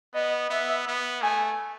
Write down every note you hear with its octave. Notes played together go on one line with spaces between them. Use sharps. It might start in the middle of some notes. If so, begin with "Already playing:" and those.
B3 D#5
B3 E5
B3
A3 G#5